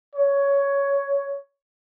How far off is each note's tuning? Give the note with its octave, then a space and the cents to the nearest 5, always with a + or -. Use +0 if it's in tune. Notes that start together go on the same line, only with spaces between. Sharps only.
C#5 +10